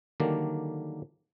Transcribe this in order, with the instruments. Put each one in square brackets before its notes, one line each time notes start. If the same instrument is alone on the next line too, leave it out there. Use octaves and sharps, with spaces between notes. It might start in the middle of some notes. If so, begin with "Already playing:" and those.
[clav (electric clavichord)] D3 D#3 F#3 G3 A#3 D4